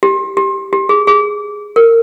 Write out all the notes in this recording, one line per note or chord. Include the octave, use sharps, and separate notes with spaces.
G4
G4
G4
G#4
G#4
A#4